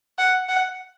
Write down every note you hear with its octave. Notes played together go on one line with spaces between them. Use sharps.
F#5
F#5